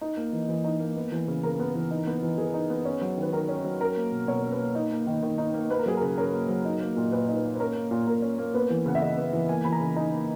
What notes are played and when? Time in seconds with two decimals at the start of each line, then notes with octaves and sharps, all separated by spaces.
0.01 D#4
0.17 A#3
0.33 E3
0.49 E3
0.64 D#4
0.80 A#3
0.96 B3
1.12 E3
1.28 C#3
1.43 C#3 A#4
1.60 B3
1.75 E3
1.91 D#4
2.07 B3
2.22 E3
2.38 E3 G#4
2.54 D#4
2.70 B3
2.85 C#4
3.01 F#3
3.18 D#3 B4
3.33 D#3 A#4
3.49 C#4
3.64 F#3
3.81 C#4 A#4
3.97 A#3
4.12 B2
4.28 B2 C#5
4.43 C#4
4.52 B4
4.59 A#3
4.75 D#4
4.91 A#3
5.07 D#3
5.23 D#3
5.38 D#4
5.54 A#3
5.70 A#3 B4
5.79 A#4
5.86 F#3 G#4
5.97 C#3 A#4
6.18 C#4 A#4
6.33 A#3
6.49 F#3
6.65 D#4
6.81 A#3
6.96 A#2
7.12 A#2 B4
7.28 D#4
7.36 B4
7.44 A#3
7.55 B4
7.59 C#4 A#4
7.75 A#3
7.91 A#2
8.07 A#2 A#4
8.22 C#4
8.39 A#3
8.54 B3 B4
8.70 E3
8.86 C#3 F#5
8.95 E5
9.02 C#3 D#5
9.17 B3
9.33 E3
9.49 A#3 G#5
9.65 E3 B5
9.72 A#5
9.80 C#3
9.96 D#4 A#5
10.13 A#3